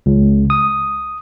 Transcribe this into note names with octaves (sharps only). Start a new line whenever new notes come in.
C#2
D#6